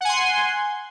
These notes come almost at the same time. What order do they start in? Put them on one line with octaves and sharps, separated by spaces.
F#5 G#5 C6